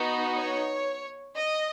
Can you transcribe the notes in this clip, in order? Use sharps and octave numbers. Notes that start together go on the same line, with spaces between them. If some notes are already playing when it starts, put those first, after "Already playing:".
Already playing: B3 D#4 F#4
C#5
D#5